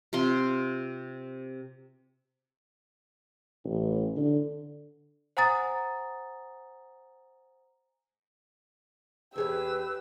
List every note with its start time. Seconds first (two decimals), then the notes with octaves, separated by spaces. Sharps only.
0.13 C3 F4 C6
3.64 A1
4.17 D3
5.37 C5 F#5 G#5 A#5 D#6 A6
9.36 E2 G4 G#4 B4 C#5 E6